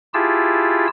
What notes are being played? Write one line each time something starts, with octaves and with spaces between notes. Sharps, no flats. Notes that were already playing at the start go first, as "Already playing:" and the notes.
E4 F4 G4 G#4 A5 E6